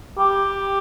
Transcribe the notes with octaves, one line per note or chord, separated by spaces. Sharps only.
G4